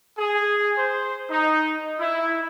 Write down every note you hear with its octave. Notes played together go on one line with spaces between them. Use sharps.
G#4
C5
D#4
E4